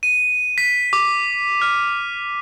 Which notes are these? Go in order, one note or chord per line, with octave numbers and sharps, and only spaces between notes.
D#7
B6
D6
F6